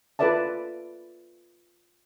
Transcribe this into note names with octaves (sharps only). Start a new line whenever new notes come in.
F4 A4 B4 D5 E5 A5